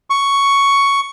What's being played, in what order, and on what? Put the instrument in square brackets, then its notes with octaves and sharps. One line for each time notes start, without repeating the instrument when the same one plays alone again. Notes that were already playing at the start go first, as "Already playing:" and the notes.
[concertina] C#6